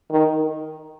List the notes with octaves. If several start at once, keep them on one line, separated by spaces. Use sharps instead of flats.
D#3